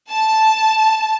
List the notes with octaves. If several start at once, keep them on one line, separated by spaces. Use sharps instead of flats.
A5